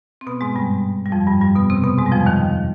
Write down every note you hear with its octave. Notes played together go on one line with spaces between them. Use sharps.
C4
B2 B3
G#2 G#3
G2 G3
G3
F2 F3
G2 G3
G2 G3
B2 B3
C3 C4
B2 B3
G#2 G#3
G3
F2 F3
D#2 D#3